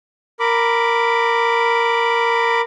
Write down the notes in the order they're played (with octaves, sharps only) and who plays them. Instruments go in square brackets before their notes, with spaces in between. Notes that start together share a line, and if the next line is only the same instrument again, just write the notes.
[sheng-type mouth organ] A#4 B5 D6